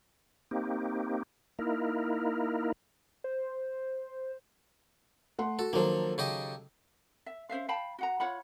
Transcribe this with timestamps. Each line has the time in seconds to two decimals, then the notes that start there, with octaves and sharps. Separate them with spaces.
0.51 A#3 C4 D#4 G4
1.59 A#3 D#4 E4 A#4
3.24 C5
5.39 A3 F#5 C6
5.59 F#4 A4
5.73 D#3 F3 F#3 A#3 A4
6.18 C#3 G4 D#5
7.26 E5
7.49 C#4 C5 E5 F5
7.68 F5 G5 A5 B5
7.99 F#4 F#5 A#5
8.20 F4 C#5 F#5 B5